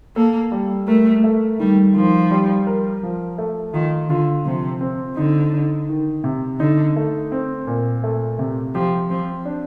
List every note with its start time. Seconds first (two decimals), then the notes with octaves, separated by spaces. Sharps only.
0.16 A#3 A4
0.52 G3
0.88 A3 A#4
1.24 A3
1.60 D#3 G3
1.95 D#3 F3
2.31 G3
2.67 A#4
3.03 F3
3.38 A3
3.74 D#3 F4
4.10 D3 F4
4.46 C3 F3
4.81 C4
5.16 D3 D#4
5.53 D#4
5.89 D#3
6.24 C3
6.60 D3 D#4
6.96 A3
7.32 C4
7.67 A#2
8.04 A3
8.39 C3
8.74 F3 G4
9.10 F3 C4
9.45 D4